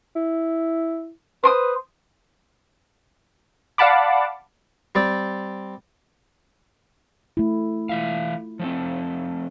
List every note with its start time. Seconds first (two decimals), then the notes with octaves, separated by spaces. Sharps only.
0.16 E4
1.44 B4 C5 C6 D#6
3.78 D5 F5 F#5 A5 B5 D6
4.95 G3 C4 D5
7.37 A3 E4
7.89 E3 F4 E5 F5
8.59 F3 A3 C4